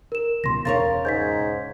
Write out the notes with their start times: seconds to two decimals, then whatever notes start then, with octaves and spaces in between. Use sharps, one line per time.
0.12 A#4 E7
0.44 C#2 B2 C6 A#6
0.65 E1 C#3 A#4 C#5 A6
1.05 G#2 G6 G#6 B6